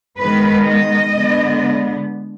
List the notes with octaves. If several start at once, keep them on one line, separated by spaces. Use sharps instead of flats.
D#3 G#3 B3 B4
D#5
D3 G#3 B3